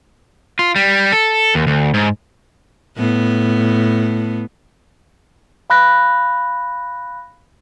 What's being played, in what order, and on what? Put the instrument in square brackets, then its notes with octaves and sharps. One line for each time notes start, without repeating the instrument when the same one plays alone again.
[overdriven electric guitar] F4
G3
A4
D#2
D2
G#2
[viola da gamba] A2 B3
[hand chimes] F5 B5 F#6 A#6